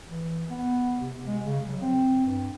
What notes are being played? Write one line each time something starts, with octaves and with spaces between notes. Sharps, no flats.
E3
B3
C3
G#3
C#3
F#3
C4
G2